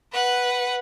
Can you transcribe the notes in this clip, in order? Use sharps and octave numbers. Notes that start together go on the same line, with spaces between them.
B4 F#5